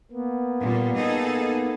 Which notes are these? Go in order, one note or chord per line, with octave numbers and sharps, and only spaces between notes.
A#3 B3
A#2 G3
D#4 G#4 A4